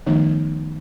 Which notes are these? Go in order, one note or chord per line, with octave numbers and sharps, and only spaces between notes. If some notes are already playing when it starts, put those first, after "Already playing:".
D#3 F3 A3 B3 D#4